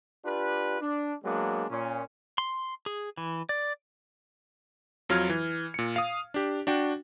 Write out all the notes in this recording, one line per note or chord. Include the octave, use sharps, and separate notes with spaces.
D4 F4 G4 B4
D4
F#3 G#3 A#3 B3 D4
A#2 C#4
C6
G#4
E3
D5
F2 F#3 F4 F6 G#6
E3
A#2 C#7
F5 D#6
D4 G4
D4 F#4 G5